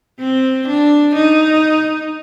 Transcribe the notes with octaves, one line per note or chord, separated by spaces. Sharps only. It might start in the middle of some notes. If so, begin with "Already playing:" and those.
C4
D4
D#4